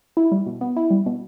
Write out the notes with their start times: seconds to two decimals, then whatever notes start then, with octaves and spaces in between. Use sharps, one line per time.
0.17 E4
0.32 G3
0.47 B2
0.61 B3
0.76 E4
0.91 G3
1.06 B2